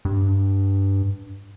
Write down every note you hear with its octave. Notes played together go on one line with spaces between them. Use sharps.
G2